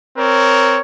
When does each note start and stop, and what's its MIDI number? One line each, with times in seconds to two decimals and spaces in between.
0.17 0.81 60
0.17 0.81 70
0.17 0.81 73